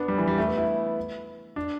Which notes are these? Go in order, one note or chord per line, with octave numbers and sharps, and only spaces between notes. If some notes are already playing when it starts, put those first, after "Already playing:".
Already playing: B3 D4
G3
E3
G3
A3
B3
E4
D4